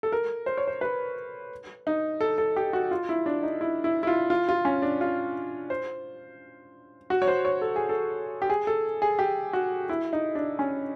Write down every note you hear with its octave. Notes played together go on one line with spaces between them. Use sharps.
A4
A#4
C5
C#5
C5
B4
D#4
A4
A4
G4
F#4
F4
E4
D4
D#4
E4
E4
E4
F4
F4
F4
C#4
D4
F4
C5
F#4
C#5
C5
C#5
A4
G#4
A4
G4
G#4
A4
G#4
G4
F#4
E4
D#4
D4
C#4